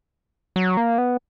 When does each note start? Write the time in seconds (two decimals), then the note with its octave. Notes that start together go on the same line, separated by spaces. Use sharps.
0.56 F#3
0.77 A#3
0.98 B3